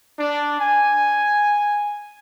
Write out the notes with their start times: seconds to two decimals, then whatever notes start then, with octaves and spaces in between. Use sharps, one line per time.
0.19 D4
0.60 G#5